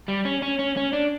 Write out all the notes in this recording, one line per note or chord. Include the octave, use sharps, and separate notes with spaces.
G3
C#4
C#4
C#4
C#4
D4